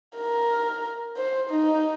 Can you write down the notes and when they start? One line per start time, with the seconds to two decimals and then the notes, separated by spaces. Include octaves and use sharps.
0.17 A#4
1.17 C5
1.49 D#4